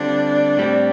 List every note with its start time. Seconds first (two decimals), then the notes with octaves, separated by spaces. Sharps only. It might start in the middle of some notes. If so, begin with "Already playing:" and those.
Already playing: D3 G3 C4 D4 F4
0.57 A2 G3 C4